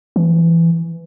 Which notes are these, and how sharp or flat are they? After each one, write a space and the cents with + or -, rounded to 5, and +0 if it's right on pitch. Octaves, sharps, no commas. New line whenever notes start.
E3 +15